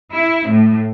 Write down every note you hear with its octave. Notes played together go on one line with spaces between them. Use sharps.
E4
A2